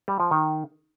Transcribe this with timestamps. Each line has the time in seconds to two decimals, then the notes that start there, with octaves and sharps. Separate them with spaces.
0.08 G3
0.20 F3
0.31 D#3